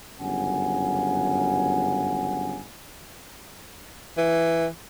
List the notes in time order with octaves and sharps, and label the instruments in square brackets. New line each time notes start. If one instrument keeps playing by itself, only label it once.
[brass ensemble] G1 F#2 C#3 F#5 G#5
[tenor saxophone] E3